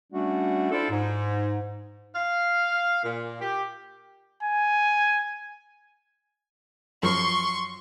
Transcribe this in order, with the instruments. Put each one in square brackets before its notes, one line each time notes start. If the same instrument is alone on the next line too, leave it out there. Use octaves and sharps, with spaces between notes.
[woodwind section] G3 A3 C#4 D4 F#4
D4 E4 F4 A4 C5 D5
G#2
[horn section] F5
A#2
G4
[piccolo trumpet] G#5
[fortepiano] F#2 F3 A#4 [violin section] C6 C#6